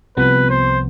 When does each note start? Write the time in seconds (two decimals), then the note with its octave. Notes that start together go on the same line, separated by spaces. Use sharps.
0.17 C2 C3 F3 B3 B4
0.50 C5